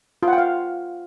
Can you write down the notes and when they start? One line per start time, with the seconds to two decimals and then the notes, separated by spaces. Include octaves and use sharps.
0.23 F4
0.28 F#5
0.33 G5
0.38 F5